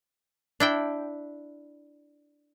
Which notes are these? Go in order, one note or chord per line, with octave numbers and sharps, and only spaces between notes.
D4 E4 G5